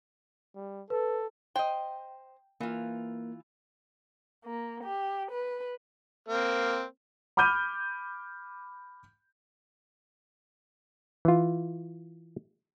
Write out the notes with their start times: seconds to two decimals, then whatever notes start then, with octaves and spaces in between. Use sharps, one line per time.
0.55 G3
0.90 A4 B4
1.56 C5 D#5 G5
2.61 E3 A#3 F4
4.45 A#3
4.84 G4
5.31 B4
6.28 A#3 C4
7.37 B5 D6 F6 G6 D#7
11.25 E3 F4